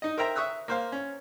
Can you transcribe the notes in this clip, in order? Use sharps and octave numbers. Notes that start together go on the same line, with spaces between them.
D#4 D#5
A#4 C5 E5 G5 A#5
E5 C#6 D#6 E6 F#6
A#3 C5 F5
C#4